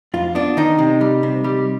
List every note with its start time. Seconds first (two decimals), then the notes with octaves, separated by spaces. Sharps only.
0.14 F2 F4
0.35 B3 D4
0.57 D#3 D#4
0.79 C3
1.01 G3
1.23 C3
1.44 G3